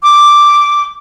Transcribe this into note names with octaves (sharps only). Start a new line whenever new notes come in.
D6